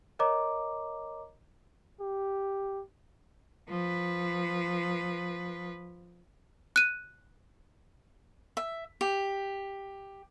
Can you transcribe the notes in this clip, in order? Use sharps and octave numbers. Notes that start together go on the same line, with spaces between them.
A#4 C#5 D#5 A#5 D6
G4
F3 B4
F#6 D#7
E5
G4